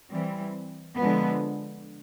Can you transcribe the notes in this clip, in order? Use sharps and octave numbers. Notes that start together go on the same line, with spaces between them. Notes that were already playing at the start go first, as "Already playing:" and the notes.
E3 G3 C4
D3 F3 G#3 B3